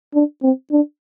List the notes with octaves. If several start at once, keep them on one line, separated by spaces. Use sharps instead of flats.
D4
C4
D4